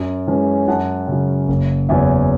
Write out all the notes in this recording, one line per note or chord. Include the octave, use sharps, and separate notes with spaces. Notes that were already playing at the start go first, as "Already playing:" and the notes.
Already playing: F#2
E3 G#3 C#4
F#2 F#5 A5
C#3 F#3
F#1
E2 C#3 F#3 C#4 E5 G#5